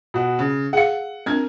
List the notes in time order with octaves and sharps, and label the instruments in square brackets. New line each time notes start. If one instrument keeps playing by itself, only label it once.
[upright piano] B2 F#4
C#3
[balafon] G#4 F5 [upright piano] F#5 C#7
[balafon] C4 D4 [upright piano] A#4 G#6